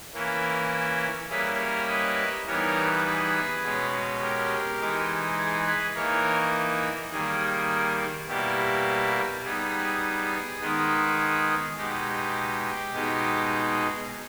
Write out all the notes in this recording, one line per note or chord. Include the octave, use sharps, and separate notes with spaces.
E3 A#3 C#4 E4
G3 A#3 C#4 E4 G#4 B4
A#4 C#5
B4 D#5
E3 G3 B3 D#4 A#4 C#5
G#4 B4
B2 G#3 C#4
G4 A#4
E3 G#3 D#4
G#4
G#4 B4
E3 A#3 D#4 A#4 C#5
D#3 G3 A#3 G#4
B2 G3 A#3 E4 G4
G3 B3 D#4 G#4
D#3 G#3 B3 D#4
G#4
B2 G#3 D#4 G4
B2 G#3 D#4